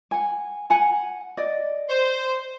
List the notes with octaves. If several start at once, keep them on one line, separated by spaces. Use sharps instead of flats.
F#5 G#5
F#5 G#5 A#5
D5 D#5
C5